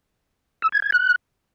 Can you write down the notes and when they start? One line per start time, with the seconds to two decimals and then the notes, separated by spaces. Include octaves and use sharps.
0.62 E6
0.72 G#6
0.82 G#6
0.92 F#6